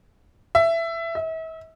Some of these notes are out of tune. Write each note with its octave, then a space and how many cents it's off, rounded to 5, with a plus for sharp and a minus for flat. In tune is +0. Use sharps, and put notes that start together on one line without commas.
E5 +15
E5 -40